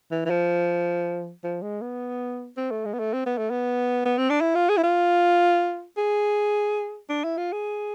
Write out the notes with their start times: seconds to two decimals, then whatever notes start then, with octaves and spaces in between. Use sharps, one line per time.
0.11 E3
0.25 E3
0.30 F3
1.44 F3
1.62 G#3
1.82 B3
2.57 C4
2.71 A3
2.85 G#3
2.93 B3
3.00 A3
3.14 C4
3.26 B3
3.38 A3
3.50 B3
4.05 B3
4.18 C4
4.30 D4
4.41 E4
4.55 F4
4.69 G#4
4.77 E4
4.83 F4
5.97 G#4
7.09 D4
7.24 E4
7.37 F4
7.52 G#4